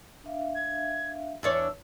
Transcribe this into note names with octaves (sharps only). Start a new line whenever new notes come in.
D4 E5 F5
G#6
E2 D4 C#5 E6